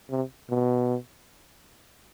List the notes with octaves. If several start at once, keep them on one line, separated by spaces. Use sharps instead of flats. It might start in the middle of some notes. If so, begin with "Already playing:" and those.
C3
B2